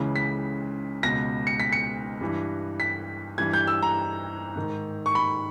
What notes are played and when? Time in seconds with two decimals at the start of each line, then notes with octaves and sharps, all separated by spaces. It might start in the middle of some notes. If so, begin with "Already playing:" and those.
Already playing: C#2 C#3 E3
0.16 B6
1.03 C#2 B2 A#6
1.47 C#7
1.60 B6
1.72 C#7
2.21 G2 E3
2.80 B6
3.38 G2 E3 G#6
3.53 G6
3.67 E6
3.83 A#5
4.56 G#2 D#3
5.06 C#6
5.15 B5